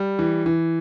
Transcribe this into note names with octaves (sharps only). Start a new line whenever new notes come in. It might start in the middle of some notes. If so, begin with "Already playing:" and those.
Already playing: G3
E3
E3